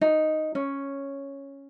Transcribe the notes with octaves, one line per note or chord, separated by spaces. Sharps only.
D#4
C#4